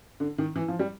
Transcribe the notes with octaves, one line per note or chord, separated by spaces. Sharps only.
D3
D#3
E3
F3
G3